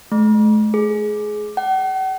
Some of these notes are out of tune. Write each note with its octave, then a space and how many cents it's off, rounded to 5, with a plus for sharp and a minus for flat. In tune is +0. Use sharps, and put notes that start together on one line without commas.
A3 -45
G#4 +15
F#5 +45